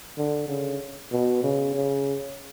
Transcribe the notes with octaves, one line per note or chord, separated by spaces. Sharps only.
D3
C#3
B2
C#3
C#3